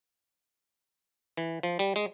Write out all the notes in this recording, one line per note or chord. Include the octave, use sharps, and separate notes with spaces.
E3
F3
G3
G#3